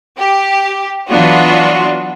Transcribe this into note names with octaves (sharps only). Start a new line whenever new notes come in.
G4
E3 F#3 B3 D4 F4 F#4